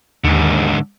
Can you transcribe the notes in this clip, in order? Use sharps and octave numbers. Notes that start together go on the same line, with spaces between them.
D#2 G#2 D3